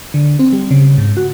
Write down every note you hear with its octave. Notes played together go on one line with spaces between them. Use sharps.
D3
C4
G3
C#3
G#2
F#4